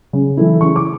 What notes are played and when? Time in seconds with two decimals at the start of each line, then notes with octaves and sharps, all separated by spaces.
0.13 C#3
0.37 E3 A3 E4
0.61 C#3 C#6
0.76 D6